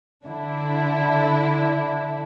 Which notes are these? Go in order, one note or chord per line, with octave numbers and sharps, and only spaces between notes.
D3 D4 E4